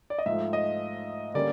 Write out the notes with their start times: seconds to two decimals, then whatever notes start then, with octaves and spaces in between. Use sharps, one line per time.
0.10 D5
0.19 D#5
0.26 G#2 F3 A3 E5
0.53 D#5
1.34 D3 G3 A#3 C#4 D5